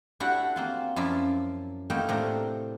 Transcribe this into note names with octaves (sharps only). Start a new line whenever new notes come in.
D4 E4 F#4 G4 F#5
A#3 C4 F4
F#2 F3 E4 F4 D5 A5
A3 A#3 D#4 E4 A#4 G5
A2 C3 C4 D4 A#4 A#5